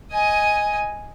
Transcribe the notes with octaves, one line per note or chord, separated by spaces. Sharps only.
D#5 G#5